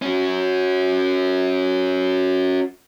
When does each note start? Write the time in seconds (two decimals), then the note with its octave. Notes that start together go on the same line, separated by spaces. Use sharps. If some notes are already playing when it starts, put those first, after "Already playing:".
0.02 C#4 F#4